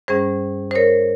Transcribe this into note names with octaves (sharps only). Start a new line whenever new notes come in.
G2 G3 C#4 G#4 C5
C5
A#4 C#5